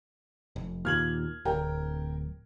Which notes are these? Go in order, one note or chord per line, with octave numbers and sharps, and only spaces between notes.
F1
D#2 A#2 F6 G#6 F#7
D1 A#4 G5